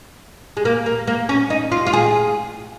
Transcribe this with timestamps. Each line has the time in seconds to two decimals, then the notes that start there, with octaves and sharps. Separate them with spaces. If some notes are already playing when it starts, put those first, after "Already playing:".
0.57 G#3
0.65 A#3
0.86 A#3
1.07 A#3
1.29 C#4
1.50 D#4
1.72 F4
1.87 F4
1.93 G#4